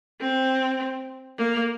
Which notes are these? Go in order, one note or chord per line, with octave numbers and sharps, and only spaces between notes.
C4
A#3